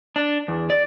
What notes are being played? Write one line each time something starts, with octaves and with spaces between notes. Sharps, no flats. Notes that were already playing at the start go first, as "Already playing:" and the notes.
D4
E2
D5